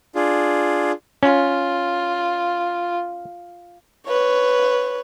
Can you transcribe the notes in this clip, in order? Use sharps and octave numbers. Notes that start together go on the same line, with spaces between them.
D4 F4 G#4
C#4 F4
B4 C#5